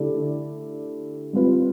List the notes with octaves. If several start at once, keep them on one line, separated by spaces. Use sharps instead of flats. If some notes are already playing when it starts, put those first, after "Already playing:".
Already playing: D3 A3 E4 G4 D5
G3 C4 F4 B4